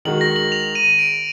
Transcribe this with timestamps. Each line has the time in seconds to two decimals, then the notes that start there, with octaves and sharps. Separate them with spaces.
0.05 D#3 G#3 D#4 F#4 F#7
0.21 A#6
0.36 F#7
0.52 F7
0.75 D#7
0.99 D7